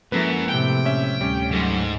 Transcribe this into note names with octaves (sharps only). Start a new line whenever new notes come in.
F#2 F3 G#3 A#3 E4 A4 B4
A2 C3 G5
C#4 E5
D2 G3 C#4 C#5
G#2 F#3 A4 F#5